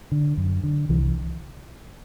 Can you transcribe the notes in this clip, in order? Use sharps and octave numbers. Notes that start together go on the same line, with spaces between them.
D3
F#2
D3
C2 E3